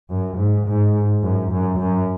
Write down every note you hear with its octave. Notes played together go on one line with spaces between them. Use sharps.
F#2
G#2
G#2
F#2
F#2
F#2